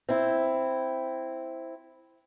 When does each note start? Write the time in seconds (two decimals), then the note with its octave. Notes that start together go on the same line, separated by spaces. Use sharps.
0.09 C4 E4